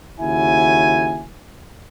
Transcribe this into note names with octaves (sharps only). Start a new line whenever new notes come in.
D#2 C#3 E4 F#4 G#5